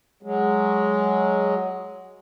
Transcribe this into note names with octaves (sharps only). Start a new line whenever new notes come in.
F#3 G#3